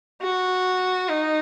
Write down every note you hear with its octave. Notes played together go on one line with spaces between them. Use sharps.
F#4
D#4